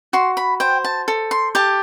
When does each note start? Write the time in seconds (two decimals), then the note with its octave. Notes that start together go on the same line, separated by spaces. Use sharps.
0.13 F#4 C6
0.37 B5
0.60 C5 G5
0.84 A5
1.08 A4
1.31 C6
1.55 G4 A5